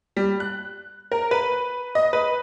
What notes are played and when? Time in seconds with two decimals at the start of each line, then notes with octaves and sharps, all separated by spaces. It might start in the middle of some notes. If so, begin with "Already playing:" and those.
0.17 G3
0.40 F#6
1.12 A#4
1.31 B4
1.95 D#5
2.13 B4